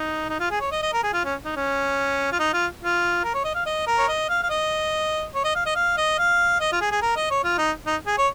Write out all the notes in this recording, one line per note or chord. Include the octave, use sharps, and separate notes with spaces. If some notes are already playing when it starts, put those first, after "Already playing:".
Already playing: D#4
D#4
F4
G#4
C#5
D#5
D#5
A#4
G#4
F4
C#4
D#4
C#4
F4
D#4
F4
F4
A#4
C#5
D#5
F5
D#5
A#4
C#5
D#5
F5
F5
D#5
C#5
D#5
F5
D#5
F5
D#5
F5
D#5
F4
G#4
G#4
A#4
D#5
C#5
F4
D#4
D#4
G#4
C#5